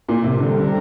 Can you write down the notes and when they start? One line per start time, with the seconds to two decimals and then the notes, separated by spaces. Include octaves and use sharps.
0.08 A#2
0.24 C3
0.39 D3 G3 C4 G4 A#4
0.59 D3